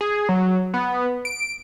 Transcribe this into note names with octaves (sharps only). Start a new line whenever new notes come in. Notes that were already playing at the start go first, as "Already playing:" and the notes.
G#4
F#3
B3
D7